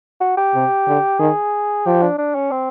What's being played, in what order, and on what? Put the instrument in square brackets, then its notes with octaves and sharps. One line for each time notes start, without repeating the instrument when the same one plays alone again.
[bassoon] F#4
G4
[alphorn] C3
D3
[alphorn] D#3 [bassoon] G#4
[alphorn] F3 [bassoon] G4
[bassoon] D4
D4
C#4
C4